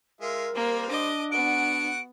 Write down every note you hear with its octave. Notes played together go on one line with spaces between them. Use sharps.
G#3 F4 A#4 E5
G3 A#3 C4
D4 D#5 D6
B3 F#4 F#5 D7